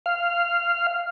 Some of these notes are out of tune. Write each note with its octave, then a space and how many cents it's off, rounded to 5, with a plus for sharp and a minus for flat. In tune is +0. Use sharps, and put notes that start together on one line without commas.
F5 -10